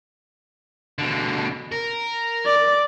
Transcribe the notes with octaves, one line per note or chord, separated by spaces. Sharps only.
B2 D3
A#4
D5